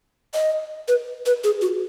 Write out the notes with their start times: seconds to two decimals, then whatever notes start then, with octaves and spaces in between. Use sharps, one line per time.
0.34 D#5
0.88 B4
1.26 B4
1.44 G#4
1.62 F#4